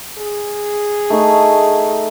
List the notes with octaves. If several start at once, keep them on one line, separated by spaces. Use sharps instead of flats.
G#4
A3 D#4 C#6